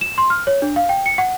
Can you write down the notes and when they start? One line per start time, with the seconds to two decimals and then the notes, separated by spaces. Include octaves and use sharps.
0.01 E7
0.18 C6
0.30 F6
0.47 C#5
0.62 D4
0.76 F5
0.89 G5
1.06 C#7
1.18 F#5